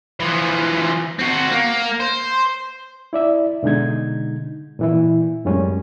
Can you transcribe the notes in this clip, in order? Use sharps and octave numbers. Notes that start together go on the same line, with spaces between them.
E3 F3
C4 F#4
A#3
C5
E4 D5 E5
B2 D3 G#3 D#4 G#6
A#2 E3 E4
F#2 A2 G3 G#3 C#4